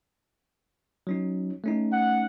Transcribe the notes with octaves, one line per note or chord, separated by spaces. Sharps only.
F#3 C#4 D#4
A3 C#4 D#4
F#5